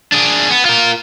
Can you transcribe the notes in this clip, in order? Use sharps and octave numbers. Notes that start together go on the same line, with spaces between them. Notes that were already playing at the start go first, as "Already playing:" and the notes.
D4 G#4
B3
F4 A#4